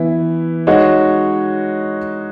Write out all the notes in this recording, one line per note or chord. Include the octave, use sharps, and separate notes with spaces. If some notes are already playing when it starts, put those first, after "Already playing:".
Already playing: E3 B3 E4
G#3 D#4 F#4 C#5